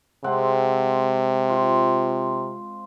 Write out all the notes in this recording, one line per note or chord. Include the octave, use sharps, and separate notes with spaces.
C3 G#3 C4 F#5
F4 C5